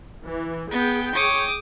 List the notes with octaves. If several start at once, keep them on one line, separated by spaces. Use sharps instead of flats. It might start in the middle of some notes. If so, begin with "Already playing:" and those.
E3
B3 G#4 G5
C#5 D6 D#6